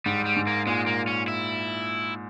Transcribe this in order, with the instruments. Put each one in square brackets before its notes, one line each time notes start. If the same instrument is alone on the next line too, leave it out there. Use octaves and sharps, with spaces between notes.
[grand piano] G#2 [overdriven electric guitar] G3
[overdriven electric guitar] G3
[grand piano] G#2
[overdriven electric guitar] A#3
[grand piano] A#2 [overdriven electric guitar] G#3
[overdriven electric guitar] A#3
C#4
E4